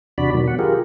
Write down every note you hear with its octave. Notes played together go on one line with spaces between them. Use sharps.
E2 C3 D4 F#4 D5 B5
B2 D#3 F#3
F#5
F4 G4 G#4 A#4